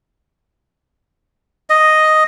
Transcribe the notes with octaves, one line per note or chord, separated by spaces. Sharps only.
D#5